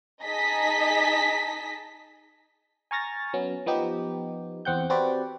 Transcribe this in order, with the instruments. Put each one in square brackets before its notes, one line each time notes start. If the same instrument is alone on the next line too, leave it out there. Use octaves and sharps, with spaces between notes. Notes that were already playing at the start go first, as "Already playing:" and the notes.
[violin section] D#4 G#4 D#5 A5 B6
[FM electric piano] G#5 A#5 C#6 F6 A6 A#6
F#3 B3 C#4
F3 B3 D#4 G4
E2 C4 F#5 G5 G6
C4 F#4 G4 B4 C5 D5